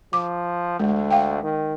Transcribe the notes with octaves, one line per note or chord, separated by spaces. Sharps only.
F3 D6
D2 G#3
F5 G5
D#3